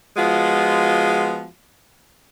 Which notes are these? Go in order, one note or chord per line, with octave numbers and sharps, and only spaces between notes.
F3 G#3 B3 F4 F#4